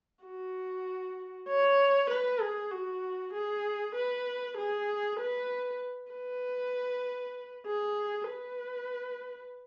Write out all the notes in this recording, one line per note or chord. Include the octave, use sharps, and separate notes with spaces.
F#4
C#5
B4
G#4
F#4
G#4
B4
G#4
B4
B4
G#4
B4